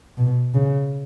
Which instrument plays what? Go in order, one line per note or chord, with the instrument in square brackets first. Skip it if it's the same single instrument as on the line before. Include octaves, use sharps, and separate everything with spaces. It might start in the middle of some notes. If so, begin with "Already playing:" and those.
[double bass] B2
C#3